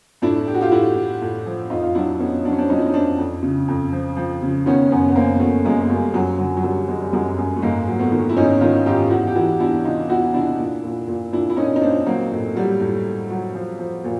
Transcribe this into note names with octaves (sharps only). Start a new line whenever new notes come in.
A2 D4 E4
A2 G4
F#4
F4 G4
A2 E4 F#4
A2
A2
F3
F2 D#4 F4
F4
F#3 D4 E4
F2 B3 C#4
F#3 D4
C#4
C4 D4
F#3 C#4 D#4
E4
D#4
F2 C4 D4
F2
C#3
F2
F3
F3
C#3
D#3 B3 C#4
F#2 B3 C#4
B3
F#2 A#3 C4
F#2 A3 B3
F#2 G#3 A#3
A#3
F#2 G3 A3
F#2 F#3
D3 F#3
F#3
F#2 G3
F#3 G#3
G3
F#2 F#3 G#3
F#2
A3
G#2 G#3 A#3
F#3
A3 B3
D#3
E4
G#2 C#4 D#4
D#3 D#4 F4
G#2 F4 G4
E2 E4 F#4
G4
E3 E4 F#4
E2 D4 E4
C3 D#4 F4
E2 E4 F#4
C3 D4 E4
A#2
A#2
A#2
A#2 D4 E4
E4
A#2 C#4 D#4
D#4
A#2 C4 D4
F#3 A#3 C4
A2
F#3 G3
A2
A2
F#3
F3
F3
A#2